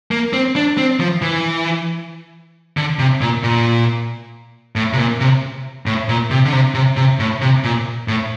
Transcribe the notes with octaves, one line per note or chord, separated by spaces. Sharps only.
A#3
C4
D4
C4
F3
E3
D3
C3
A#2
A#2
A2
C3
A#2
C3
A2
A#2
C3
D3
C3
C3
C3
A2
C3
A#2
A2